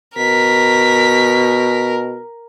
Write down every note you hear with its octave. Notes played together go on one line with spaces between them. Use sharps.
B2 A#4 B6